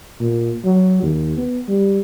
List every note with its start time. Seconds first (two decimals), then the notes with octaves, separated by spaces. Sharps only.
0.21 A#2
0.65 F#3
1.03 D#2
1.37 B3
1.68 G3